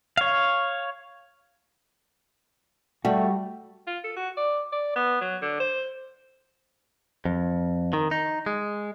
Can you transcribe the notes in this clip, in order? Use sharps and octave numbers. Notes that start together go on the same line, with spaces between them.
C#5 F5
G3 A3 F#4
F4
A4
F#4
D5
D5
B3
F#3
D3
C5
F2
D#3
D#4
G#3